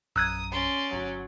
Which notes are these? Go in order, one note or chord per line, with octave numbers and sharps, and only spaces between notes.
A#1 F#2 A#5 D#6 E6 F#6 G#6
C#4 D5 C6
G1 F#3